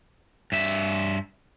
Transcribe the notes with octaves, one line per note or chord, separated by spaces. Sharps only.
G2 E5